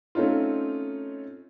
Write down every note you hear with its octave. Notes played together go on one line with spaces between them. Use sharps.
A3 C4 C#4 D#4 F4